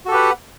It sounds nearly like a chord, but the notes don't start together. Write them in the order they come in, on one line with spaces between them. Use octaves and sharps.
F#4 A4 G4 B4 F#5